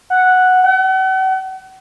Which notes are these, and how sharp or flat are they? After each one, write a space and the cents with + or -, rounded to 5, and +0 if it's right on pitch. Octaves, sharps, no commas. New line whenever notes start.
F#5 -5
F#5 +40